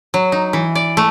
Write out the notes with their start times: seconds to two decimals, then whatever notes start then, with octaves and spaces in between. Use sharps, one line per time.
0.14 F#3
0.32 D#4
0.53 E3
0.75 D5
0.97 A3